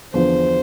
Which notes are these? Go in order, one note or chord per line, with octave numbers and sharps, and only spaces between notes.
E2 D3 F3 C5